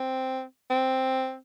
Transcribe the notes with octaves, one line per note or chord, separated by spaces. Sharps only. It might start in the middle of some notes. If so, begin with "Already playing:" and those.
Already playing: C4
C4